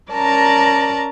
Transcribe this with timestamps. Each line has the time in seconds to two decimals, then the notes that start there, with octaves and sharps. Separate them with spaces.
0.11 C#4 A#4 D5 A5 A#5